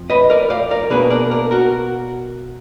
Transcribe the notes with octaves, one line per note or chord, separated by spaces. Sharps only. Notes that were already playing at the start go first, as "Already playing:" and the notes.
Already playing: F2 F3
B4 D#5
A#4 D5
D5 F5
A#4 D5
B2 A#3 D4 G#4 B4
A#4 D5
A#4 D5
F#4 A#4